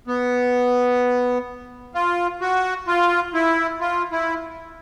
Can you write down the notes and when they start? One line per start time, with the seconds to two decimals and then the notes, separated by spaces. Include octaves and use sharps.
0.07 B3
1.94 F4
2.41 F#4
2.87 F4
3.34 E4
3.81 F4
4.12 E4